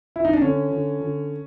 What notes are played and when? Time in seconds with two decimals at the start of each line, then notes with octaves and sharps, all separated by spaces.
0.16 E4
0.25 D#4
0.33 D4
0.42 D3 C#4
0.71 D3
1.00 D3